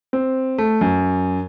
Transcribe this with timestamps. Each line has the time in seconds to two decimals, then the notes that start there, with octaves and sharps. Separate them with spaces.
0.13 C4
0.58 A3
0.81 F#2